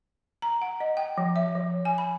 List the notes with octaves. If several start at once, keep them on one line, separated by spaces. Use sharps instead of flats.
A#5
F#5
D#5
G5
F3
E5
F3
G#5
B5